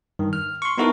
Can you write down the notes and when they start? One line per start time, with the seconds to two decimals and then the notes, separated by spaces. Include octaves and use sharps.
0.19 G2 D#3
0.33 F6
0.62 C6 C#6
0.78 B3 D#4 E4 F#4 A4 A#4